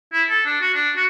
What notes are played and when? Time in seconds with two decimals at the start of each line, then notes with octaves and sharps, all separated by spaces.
0.13 E4
0.30 A4
0.46 D4
0.61 F#4
0.74 D4
0.96 F#4